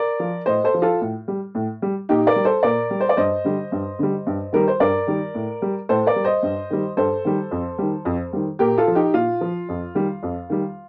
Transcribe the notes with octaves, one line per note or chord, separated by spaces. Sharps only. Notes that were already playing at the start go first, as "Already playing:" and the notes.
Already playing: A#4 D5
F3
A2 C5 D#5
A4 C5
F3
F4 A4
A2
G3
A2
G3
A#2 D#4 G4
A#4 D5
G3
A4 C5
A#2 A#4 D5
G3
C5
D5
G2 C5 D#5
D3 G3
G2
D3 G3
G2
D#3 G3 A#4
C5
G2 A#4 D5
D#3 G3
A2
G3
A2 A4 C5
A#4 D5
G3
C5 D#5
G2
D#3 G3
G2 A4 C5
D#3 G3
F2
D#3 G3
F2
D#3 G3
A#2 G4 A#4
F4 A4
F3
D#4 G4
A#2 F4
F3
F2
D#3 G3
F2
D#3 G3